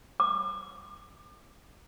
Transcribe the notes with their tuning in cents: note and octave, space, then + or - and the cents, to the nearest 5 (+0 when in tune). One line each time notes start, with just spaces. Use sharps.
D6 +40